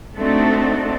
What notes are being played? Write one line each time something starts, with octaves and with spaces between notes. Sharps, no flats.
A3 C4 D4 D#4 F#4 A4